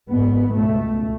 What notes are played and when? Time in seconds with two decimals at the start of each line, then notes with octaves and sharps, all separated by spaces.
0.09 G#1 G#2 B3
0.54 C#2 B2 A3